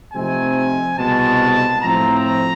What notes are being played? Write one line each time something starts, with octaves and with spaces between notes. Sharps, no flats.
C3 F3 A3 C4 D#4 G#5
C2 B2 G#3 A5
A2 F3 A3 C4 A#5
A#5